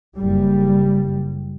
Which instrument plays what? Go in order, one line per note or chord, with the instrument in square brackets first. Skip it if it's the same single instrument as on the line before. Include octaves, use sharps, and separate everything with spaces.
[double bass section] F#1 G3